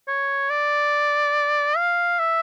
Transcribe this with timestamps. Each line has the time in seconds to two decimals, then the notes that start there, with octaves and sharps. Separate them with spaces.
0.08 C#5
0.50 D5
1.77 F5
2.19 E5